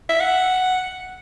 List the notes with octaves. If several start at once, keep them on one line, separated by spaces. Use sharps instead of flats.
E5
F#5